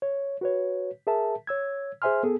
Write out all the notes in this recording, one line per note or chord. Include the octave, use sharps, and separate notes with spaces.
C#5
F#4 B4 C#5
G#4 A#4 E5 A5
C#5 E6 G#6
G#4 C5 E5 G#5 C6 F6
B3 G#4 A4